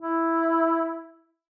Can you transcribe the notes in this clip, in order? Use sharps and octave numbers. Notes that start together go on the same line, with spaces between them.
E4